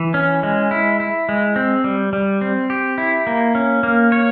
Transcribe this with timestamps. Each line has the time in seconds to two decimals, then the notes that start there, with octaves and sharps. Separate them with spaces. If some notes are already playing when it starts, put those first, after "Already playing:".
Already playing: E3
0.14 C#4
0.43 G#3
0.71 E4
1.00 E4
1.29 G#3
1.56 C4
1.84 G3
2.13 G3
2.41 C4
2.70 G4
2.98 E4
3.27 A#3
3.55 C#4
3.83 A#3
4.12 C#5